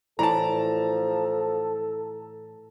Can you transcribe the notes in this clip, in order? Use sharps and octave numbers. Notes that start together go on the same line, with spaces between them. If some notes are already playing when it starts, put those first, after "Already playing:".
A2 E3 F3 A4 D5 A5 A#5